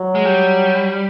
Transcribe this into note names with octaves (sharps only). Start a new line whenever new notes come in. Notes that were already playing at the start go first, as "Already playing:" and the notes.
Already playing: F#3
G#3
G3